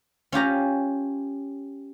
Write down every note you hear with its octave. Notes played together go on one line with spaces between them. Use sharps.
C#4 F4 G4 A#5